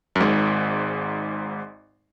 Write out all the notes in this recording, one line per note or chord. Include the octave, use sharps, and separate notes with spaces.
F#2
G#1 G#2